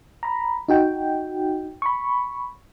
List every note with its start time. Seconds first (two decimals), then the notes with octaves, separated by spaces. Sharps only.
0.23 A#5 B5
0.69 D#4 F#4 G5
1.82 B5 C#6